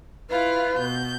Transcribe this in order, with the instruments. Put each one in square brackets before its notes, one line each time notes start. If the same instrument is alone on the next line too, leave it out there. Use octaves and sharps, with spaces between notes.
[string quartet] E4 F4 F5 [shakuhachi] B4
[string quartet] B2 G6